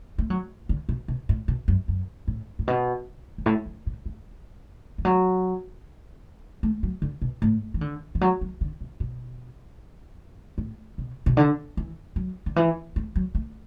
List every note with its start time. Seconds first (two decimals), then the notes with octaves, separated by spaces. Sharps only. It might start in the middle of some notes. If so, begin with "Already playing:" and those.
0.18 A3
0.30 F#3
0.69 D3
0.89 B2
1.08 B2
1.29 A2
1.48 B2
1.68 F#2
1.88 F#2
2.28 A2
2.59 A2
2.68 B2
3.38 F#2
3.46 A2
3.66 F#2
3.86 A2
4.06 A3
4.98 E3
5.05 F#3
6.63 A3
6.83 F#3
7.02 D3
7.22 B2
7.42 A2
7.74 E3
7.81 D3
8.15 E3
8.21 F#3
8.41 F#3
8.61 D3
8.81 B2
9.00 B2
10.58 A2
10.98 B2
11.26 B2
11.37 D3
11.77 E3
12.16 F#3
12.46 D3
12.56 E3
12.96 A3
13.16 F#3
13.35 A3